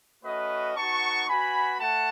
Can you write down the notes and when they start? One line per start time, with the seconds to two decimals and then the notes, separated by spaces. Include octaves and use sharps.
0.24 A3 C#4 F#4 B4 D#5
0.76 B3 D#4 F#4 A5 C#6
1.28 B3 F#4 G#5 B5
1.81 A3 F#5 A5